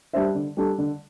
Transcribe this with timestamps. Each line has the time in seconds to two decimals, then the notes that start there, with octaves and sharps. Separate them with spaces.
0.13 G3 D4 C5 E5
0.35 D3
0.57 G3 D4 A4
0.78 D3